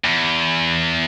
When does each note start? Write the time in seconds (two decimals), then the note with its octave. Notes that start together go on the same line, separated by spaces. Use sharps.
0.04 E2